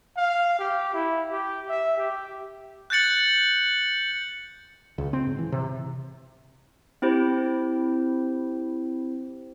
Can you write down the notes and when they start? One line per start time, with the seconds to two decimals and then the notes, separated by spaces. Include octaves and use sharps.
0.17 F5
0.59 G4
0.94 E4
1.31 G4
1.69 E5
1.98 G4
2.90 F#6 G6 A6 C#7 F#7
4.98 C#2
5.13 C4
5.27 G#2
5.38 E3
5.52 C3
7.02 C4 E4 G4 C5